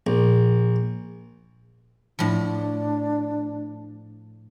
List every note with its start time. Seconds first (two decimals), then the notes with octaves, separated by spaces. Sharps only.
0.07 A#1
2.19 A2 F3 D4